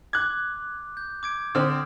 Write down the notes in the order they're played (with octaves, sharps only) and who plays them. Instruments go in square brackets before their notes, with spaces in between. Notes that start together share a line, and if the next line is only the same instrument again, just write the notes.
[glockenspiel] D6 [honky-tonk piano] F#6 G#6
[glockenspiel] G6
D6 G#6 D7
[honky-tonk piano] D3 C4 [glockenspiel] D#6 F6